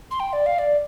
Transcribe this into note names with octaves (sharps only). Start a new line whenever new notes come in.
C6
G5
D5
F5
D5